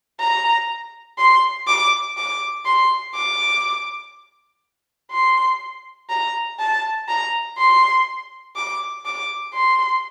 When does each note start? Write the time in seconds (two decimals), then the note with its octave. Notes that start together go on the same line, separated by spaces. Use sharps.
0.20 A#5
1.18 C6
1.67 D6
2.17 D6
2.65 C6
3.15 D6
5.12 C6
6.10 A#5
6.59 A5
7.08 A#5
7.58 C6
8.56 D6
9.05 D6
9.54 C6